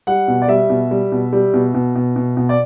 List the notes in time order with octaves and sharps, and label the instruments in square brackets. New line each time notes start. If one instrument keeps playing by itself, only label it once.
[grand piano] G3 F#5
B2
D5
G3 E5
B2
G3
B2
G3
B2
B2
B2
B2
B2
D5